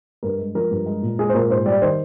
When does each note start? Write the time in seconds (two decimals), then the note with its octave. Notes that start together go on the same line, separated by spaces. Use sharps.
0.23 G2 A#4
0.39 G#3
0.55 F3 A#4
0.71 G2
0.86 G#3
1.02 A#2
1.19 G#3 G#4
1.29 C5
1.34 A#2 A#4
1.50 G#2 C5
1.66 G3 D5
1.82 D#3 C5